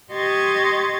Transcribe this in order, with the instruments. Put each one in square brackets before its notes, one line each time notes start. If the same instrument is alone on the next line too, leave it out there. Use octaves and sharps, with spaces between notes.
[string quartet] G4 D#5 C6 C#6 G#6 A6